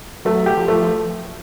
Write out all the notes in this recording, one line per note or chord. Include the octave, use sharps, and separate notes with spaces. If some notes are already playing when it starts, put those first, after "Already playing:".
F#3 A3
G4
F3
A3
F3